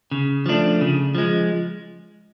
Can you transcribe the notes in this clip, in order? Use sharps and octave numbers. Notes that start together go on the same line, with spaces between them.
C#3
F3 A3 D4
C#3
F3 G#3